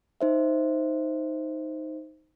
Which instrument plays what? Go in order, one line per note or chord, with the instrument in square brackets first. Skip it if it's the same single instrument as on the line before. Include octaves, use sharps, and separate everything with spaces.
[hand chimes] D#4 C5 E5